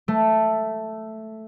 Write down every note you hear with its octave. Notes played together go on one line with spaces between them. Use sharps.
A3